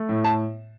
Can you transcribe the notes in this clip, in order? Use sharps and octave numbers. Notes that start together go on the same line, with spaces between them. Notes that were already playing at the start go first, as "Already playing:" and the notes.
Already playing: A3
A2
A5